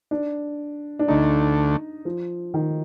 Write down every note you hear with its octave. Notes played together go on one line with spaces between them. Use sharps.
D4
D4
D2 D3 A3 D#4
F3
D#3